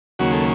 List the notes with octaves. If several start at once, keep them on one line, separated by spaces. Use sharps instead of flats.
D#2 C#3 F#3 A#3 F#4
A4